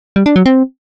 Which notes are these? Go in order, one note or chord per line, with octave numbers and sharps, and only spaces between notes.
G3
D4
F#3
C4